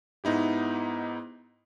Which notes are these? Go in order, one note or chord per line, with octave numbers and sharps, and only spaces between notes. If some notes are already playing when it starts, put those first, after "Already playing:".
G#2 B3 D#4 E4 G4